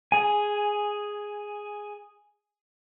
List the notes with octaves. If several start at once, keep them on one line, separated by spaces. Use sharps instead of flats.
G#4 G#5